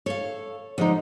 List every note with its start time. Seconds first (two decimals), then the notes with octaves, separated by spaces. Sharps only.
0.06 A4 C#5 F5
0.78 D3 F3 G#3 D#4